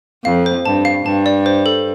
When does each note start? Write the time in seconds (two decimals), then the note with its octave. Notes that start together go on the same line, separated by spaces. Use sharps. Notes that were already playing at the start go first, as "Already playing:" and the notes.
0.25 F2 F5
0.46 C5
0.65 G2 A5
0.85 F5
1.05 G2 A5
1.26 D5
1.46 C5
1.66 A4